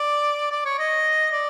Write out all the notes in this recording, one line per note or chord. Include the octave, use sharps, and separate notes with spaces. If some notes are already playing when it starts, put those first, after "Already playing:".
Already playing: D5
D5
C#5
D#5
D5